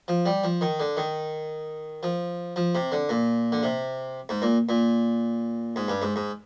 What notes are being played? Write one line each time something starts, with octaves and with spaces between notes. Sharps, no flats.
F3
G3
F3
D#3
D3
D#3
F3
F3
C3
D3
A#2
D3
C3
G#2
A#2
A#2
G#2
G2
G#2
G#2